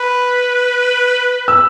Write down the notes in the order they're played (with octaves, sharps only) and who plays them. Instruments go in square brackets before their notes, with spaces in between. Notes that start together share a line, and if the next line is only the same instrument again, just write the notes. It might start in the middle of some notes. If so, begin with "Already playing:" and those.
Already playing: [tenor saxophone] B4 [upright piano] B5
[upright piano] E6